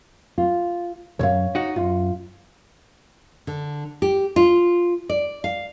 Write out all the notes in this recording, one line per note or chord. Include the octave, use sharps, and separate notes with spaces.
F4
C#2 F#2 C#5 F5
D#4 F#4
F#2 F4
D3
G4
F4
D5
F5